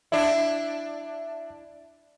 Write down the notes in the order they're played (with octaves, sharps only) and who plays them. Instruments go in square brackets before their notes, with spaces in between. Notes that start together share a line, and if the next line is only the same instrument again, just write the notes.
[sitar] D4 E4 [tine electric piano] E5